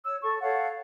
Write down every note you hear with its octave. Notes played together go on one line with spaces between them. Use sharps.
C#5 E6
A4 C#6
A4 C#5 F5 F#5